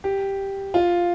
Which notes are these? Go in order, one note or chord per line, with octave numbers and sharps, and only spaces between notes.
G4
F4